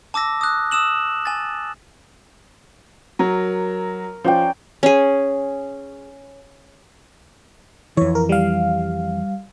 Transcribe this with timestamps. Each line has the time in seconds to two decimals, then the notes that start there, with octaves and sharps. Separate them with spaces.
0.14 A5 D6 E6 A#6
0.41 D#6 F#6
0.71 D#6 E6 E7 F#7
1.25 G#5 A6
3.19 F#3 A#4
4.24 F3 C#4 D5 G5
4.83 C#4 G#4
7.97 F2 E3 C#5
8.15 A#4
8.29 G3 F5